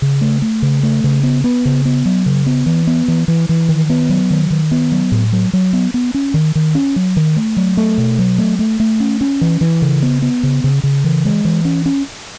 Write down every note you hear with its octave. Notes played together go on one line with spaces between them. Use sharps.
C#3
A3
A3
C#3
A3
C#3
B3
B3
C#3
B3
F#3
C#3
B3
E3
B3
E3
E3
E3
D#3
B3
F#3
D#3
D#3
B3
F#3
A2
F#3
F#3
B3
B3
C#4
D#3
D#3
C#4
F#3
D#3
A3
F#3
A3
B2
F#3
A3
A3
A3
C#4
C#4
E3
E3
C#3
B3
B3
C#3
C#3
C#3
E3
G#3
E3
C#4
C#4